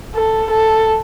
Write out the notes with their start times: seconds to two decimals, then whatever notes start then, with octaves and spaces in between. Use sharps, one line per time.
0.15 A4
0.51 A4